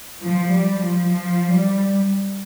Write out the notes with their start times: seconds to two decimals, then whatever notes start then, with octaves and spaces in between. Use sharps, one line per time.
0.24 F3
0.52 G3
0.80 F3
1.09 F3
1.51 G3